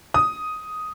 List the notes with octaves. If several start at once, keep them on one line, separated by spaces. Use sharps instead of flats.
D#6